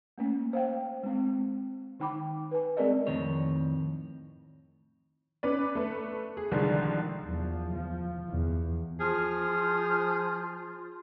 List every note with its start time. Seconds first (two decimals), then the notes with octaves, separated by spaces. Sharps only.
0.18 A3 A#3 C#4
0.53 C5 F5 G5
1.03 G#3 C4
2.00 D#3 D#4 G5 B5 D6
2.51 B4 G#5
2.77 G#3 C4 G#4 A#4 D5 D#5
3.07 F2 A2 D#3 C4 C#5
5.43 C#4 B4 D5
5.75 A3 B4
6.37 G#4
6.51 C2 D3 D#3 F3 G#3
7.26 E2 F3
7.74 F3
8.29 E2
9.00 F3 F4 G#4 F6